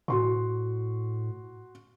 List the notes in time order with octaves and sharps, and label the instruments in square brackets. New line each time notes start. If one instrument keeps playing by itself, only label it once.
[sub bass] A2 [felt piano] F#4 C6 C#6